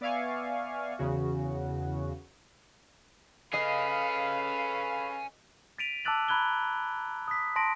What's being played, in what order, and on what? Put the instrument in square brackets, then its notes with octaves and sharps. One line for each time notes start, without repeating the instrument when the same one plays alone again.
[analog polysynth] B3 D5 E5 F5 G#5 C#6
E2 C#3 F#4
[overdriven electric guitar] C#4 G#4 [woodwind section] A4 B4 F5 [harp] D#5 C7 [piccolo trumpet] B5
[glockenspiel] A6 B6 D7 D#7 F7
A5 D6 E6 F#6 A6 F#7
A#5 B5 F#6 G#6 G7
D#6 B6
A5 C6 A#6 D7